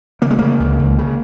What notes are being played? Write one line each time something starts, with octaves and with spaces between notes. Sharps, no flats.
C#3 A#3
G#3
C#3 A#3
C#2
C#2
C#3